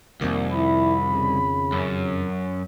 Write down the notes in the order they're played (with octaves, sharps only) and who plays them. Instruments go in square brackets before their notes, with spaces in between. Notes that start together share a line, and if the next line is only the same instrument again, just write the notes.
[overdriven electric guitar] C2 [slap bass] F2 D#3 [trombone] A#3
[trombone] E4 [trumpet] B5
[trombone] C#3
[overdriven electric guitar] F#2